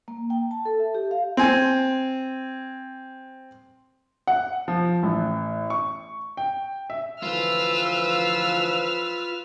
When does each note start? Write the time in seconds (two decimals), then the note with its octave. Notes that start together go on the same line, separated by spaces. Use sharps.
0.08 A#3
0.30 G5
0.51 A5
0.65 A4
0.80 E5
0.95 G4
1.11 F5
1.37 C4 G#5
4.27 F#5
4.68 F3
5.03 A1
5.70 C#6
6.37 G5
6.90 E5
7.22 D2 E3 F3 F4 B4 E6 F6